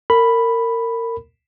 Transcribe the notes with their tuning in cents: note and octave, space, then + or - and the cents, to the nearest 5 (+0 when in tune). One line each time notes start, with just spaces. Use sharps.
A#4 -25 B5 +0